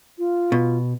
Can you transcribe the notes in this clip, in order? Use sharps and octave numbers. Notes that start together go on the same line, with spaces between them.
F4
B2